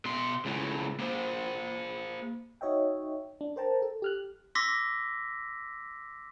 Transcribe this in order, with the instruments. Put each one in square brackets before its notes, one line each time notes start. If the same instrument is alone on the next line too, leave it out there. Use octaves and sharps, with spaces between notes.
[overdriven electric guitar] B2 C6
C#2 A2
A#3 C5
[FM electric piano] D#4 F#4 C#5 D#5 E5 G5
D4
A#4 C5 G5 A5 A#5
A4
G4 F6 F#6
[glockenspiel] C6 D6 E6 A#6 B6